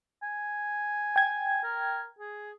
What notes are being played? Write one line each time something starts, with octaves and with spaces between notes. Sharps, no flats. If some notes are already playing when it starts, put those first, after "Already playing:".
G#5
G5 G#6
A#4
G#4